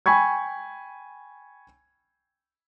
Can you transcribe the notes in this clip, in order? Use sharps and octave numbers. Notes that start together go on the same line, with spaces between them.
G5 G#5 B5 C#6 G#6